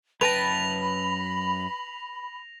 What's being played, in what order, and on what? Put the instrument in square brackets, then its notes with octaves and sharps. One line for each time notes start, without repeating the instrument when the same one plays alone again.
[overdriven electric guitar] F#2 G5 [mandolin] B4 A5 [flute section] B5 [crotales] A#6 F7